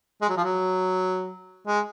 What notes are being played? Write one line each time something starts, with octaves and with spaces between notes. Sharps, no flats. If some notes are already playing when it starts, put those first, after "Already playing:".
G#3
F#3
F3
F#3
G#3